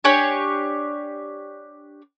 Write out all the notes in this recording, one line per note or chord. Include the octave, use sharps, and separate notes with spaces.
D4 G4 C#5 G#5